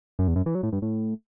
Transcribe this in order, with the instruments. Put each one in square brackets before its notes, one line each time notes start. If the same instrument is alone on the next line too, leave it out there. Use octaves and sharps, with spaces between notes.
[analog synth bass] F#2
E2
F#2
E3
F#3
A2
G2
A2